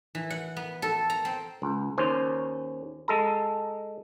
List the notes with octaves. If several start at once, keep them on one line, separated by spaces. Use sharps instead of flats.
E3
F#5
B3
A4
A#5
C4
C#2
D#2 C#4 C5
G#3 A4 A#5